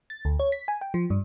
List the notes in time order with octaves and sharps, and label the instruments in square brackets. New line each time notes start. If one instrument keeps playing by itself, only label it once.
[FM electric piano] A6
D2
C#5
B6
G#5
G5
F3
G2